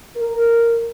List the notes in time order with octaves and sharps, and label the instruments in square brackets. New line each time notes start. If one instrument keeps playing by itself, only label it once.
[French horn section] A#4